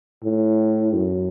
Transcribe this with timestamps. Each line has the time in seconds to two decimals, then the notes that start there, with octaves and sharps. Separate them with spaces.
0.23 A2
0.94 F#2